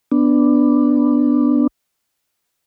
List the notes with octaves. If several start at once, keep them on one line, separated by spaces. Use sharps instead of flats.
B3 D4